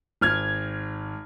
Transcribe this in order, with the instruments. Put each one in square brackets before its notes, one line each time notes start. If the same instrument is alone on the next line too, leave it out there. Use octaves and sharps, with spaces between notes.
[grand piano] G#1 F6 G#6